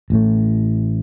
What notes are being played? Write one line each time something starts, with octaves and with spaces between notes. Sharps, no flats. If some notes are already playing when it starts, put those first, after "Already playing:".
A1 A2 A3